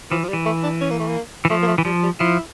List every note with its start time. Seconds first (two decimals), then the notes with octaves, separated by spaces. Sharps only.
0.11 E3 F3
0.23 F3
0.29 G3
0.33 E3
0.46 A3
0.63 D4
0.81 C#4
0.91 A#3
0.99 A3
1.08 A#3
1.45 E3
1.50 F3 A3
1.62 A#3
1.68 A3
1.78 E3
1.85 F3 G3
2.03 G3
2.20 F3 E4